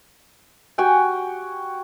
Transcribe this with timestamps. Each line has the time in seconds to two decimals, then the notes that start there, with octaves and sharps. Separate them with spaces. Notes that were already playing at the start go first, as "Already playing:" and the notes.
0.78 F#4 G4 G5 G#5